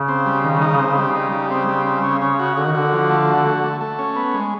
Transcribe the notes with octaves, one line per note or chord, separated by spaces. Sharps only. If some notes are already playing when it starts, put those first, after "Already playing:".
Already playing: C#3
C4
G3
D#3
D#4
C4
C#3 G3
D#4
G3
C#3 C4
G3
C4
C#4
C#4
F#4
D3 F#4
D#3
D3 F#4
F3
A3
F#4
A3
A3
A3
C#4
B3
G#3